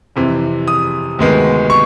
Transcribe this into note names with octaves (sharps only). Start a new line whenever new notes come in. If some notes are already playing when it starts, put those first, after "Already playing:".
F2 C3 E3
D#6
D2 C3 D#3 G#3 B3
C#6